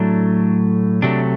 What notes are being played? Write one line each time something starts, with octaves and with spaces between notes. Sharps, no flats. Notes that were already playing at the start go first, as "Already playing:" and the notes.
Already playing: A2 F#3 A3 D4
C3 F#3 A3 D4